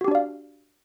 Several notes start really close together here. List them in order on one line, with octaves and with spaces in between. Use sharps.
F#4 G4 D4 D5 F5